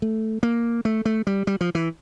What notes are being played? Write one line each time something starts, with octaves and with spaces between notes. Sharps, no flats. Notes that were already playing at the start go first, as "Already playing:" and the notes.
A3
A#3
A3
A3
G3
G3
F3
E3